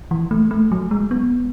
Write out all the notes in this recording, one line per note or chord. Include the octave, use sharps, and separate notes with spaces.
E3
A3
A3
F#3
G#3
B3